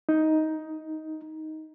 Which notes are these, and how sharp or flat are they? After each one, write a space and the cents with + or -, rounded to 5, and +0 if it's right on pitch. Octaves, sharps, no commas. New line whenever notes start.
D#4 +10